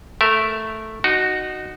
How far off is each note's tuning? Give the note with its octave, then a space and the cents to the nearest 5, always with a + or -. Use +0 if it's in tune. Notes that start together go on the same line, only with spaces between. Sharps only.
A3 +0 A#4 +0 E5 +0
D#4 -20 F#4 +0